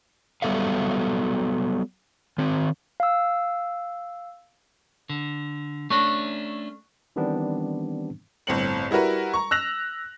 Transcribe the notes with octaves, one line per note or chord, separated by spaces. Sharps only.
F#3 G3 B3 A4 E5 F5
D#3 C4
F5 E6
D3
A3 C#4 D4 C#6 F#6 A#6
D#3 E3 G3 B3 C4 D4
G1 A2 C4 C#7 F#7
G3 E4 F#4 A#4 B4
A#5 C#6
E6 F#6 A#6 F7